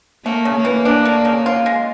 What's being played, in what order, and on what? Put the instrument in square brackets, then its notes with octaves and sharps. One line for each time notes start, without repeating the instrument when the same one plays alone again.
[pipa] A3 [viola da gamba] A#3
[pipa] C#3
[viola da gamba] A#3
[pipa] E3
D4
A3
C#3
F4
G#3